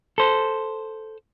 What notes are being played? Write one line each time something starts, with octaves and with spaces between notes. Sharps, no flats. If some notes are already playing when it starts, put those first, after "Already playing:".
A4 C5